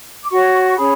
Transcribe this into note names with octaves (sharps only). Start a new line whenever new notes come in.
D6
F#4 C#5 C#6
C#6
C#6
C#4 G#4 C#5 B5